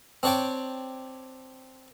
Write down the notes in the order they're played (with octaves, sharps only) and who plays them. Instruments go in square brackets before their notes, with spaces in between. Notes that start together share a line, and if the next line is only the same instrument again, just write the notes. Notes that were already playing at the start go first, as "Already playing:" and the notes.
[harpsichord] C4 D4 C#5 D5 G5